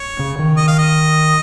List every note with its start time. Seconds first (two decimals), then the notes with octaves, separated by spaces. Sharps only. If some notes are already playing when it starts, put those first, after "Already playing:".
Already playing: C#5
0.19 C#3
0.39 D#3
0.57 D#5
0.68 F5
0.79 D#5